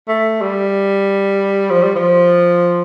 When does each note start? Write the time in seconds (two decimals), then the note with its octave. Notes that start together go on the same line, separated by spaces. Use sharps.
0.08 A3
0.41 G3
1.70 F3
1.83 G3
1.96 F3